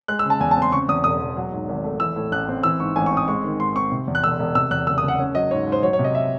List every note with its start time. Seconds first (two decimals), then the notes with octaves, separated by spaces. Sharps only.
0.08 G#3 F#6
0.19 E6
0.25 C#3
0.30 A5
0.40 E2 G#5
0.51 A5
0.57 C4
0.62 C6
0.72 C#3 C#6
0.88 E2 D#6
1.04 E1 D#6
1.20 E1
1.36 F#3
1.52 G#2
1.69 G#1
1.84 A3
2.00 E3 E6
2.16 A2
2.32 A1 F#6
2.48 C4
2.63 E3 E6
2.80 G#2 C#6
2.96 A1 G#5
3.06 C#6
3.12 C4
3.17 D#6
3.28 G#3 C#6
3.44 D#3
3.60 G#2 C6
3.75 C4 C#6
3.92 C3
4.08 E2
4.15 F#6
4.23 E1 E6
4.39 E1
4.55 C3 E6
4.71 E2 F#6
4.87 F#1 E6
4.98 D#6
5.03 F#1
5.08 F#5
5.19 C#4
5.35 F#3 D#5
5.51 G#2 C#5
5.67 G#2
5.72 C5
5.83 F#3 C#5
5.93 C#5
5.99 C3
6.04 D#5
6.15 E5